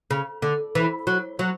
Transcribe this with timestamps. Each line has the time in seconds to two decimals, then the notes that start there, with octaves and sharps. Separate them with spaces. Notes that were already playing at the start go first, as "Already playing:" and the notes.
0.11 C#3
0.42 D3
0.75 E3
1.07 F#3
1.39 F#3